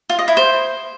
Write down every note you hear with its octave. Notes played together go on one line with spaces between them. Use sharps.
F4
D#5
E4
C5